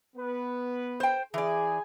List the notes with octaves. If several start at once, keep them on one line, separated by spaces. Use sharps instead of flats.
B3 B4
C5 G5
E3 G#4 D5 G#5